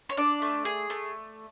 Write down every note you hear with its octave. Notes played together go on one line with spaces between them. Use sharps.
C#5
D4 D5
A3
G#4
A3